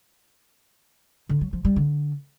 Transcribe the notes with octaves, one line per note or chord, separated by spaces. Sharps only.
D3
F#3
F3
G3
D3